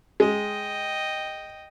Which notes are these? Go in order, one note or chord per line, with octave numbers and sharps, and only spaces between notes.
G#3 D#5 G5